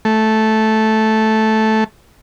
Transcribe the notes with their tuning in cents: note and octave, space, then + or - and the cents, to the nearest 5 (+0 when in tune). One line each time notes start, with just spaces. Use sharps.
A3 -10